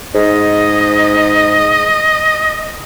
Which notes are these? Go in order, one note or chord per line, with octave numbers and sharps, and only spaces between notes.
G#2 D#5